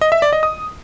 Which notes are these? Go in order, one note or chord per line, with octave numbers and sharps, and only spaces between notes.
D#5
E5
D5
D#5
D#6